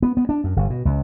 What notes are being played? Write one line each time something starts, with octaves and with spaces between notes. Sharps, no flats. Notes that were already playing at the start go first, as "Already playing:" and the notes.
B3
B3
D4
F#2
G1
B2
C#2